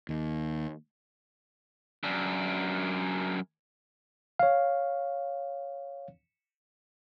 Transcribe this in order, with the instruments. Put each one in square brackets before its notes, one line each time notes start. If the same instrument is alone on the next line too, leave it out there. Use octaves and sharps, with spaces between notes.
[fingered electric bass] D#2
[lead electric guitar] F#2 D4
[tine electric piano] C#5 F5